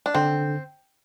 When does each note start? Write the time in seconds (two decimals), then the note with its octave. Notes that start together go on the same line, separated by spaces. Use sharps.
0.06 D4
0.15 D3 C4